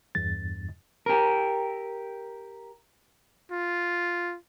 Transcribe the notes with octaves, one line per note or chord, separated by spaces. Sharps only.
E2 G2 A6
G4 A#4
F4